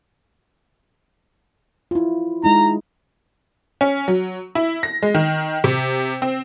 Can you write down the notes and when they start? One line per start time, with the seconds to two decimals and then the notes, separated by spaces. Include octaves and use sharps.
1.91 E4 F4
2.44 G#3 D#4 E4 A#5
3.81 C#4
4.08 F#3
4.55 E4
4.83 A#6
5.02 G#3
5.15 D#3
5.64 C3
6.22 C4